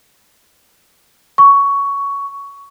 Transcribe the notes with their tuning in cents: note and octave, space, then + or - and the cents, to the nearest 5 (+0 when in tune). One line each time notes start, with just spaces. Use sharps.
C#6 +15